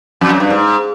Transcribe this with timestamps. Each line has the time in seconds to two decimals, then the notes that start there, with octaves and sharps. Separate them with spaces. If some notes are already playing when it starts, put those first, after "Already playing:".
0.21 F2
0.30 F#2
0.40 G2
0.50 G#2